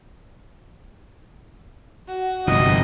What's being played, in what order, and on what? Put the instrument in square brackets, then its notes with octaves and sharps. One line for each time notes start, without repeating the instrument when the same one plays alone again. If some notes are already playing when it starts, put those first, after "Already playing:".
[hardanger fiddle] F#4
[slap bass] G1 F3 [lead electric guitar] C3 D#4 [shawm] D#5